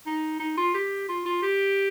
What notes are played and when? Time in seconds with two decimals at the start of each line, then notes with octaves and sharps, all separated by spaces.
0.06 D#4
0.40 D#4
0.58 F4
0.74 G4
1.09 F4
1.26 F4
1.42 G4